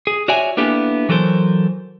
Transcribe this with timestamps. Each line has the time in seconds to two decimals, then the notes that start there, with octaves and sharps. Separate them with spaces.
0.07 G#4
0.28 F#4 C#5 D5 E5 G#5
0.57 A#3 B3 D4 E4 G4 A4
1.09 E3 F#3 A4 A#4 C5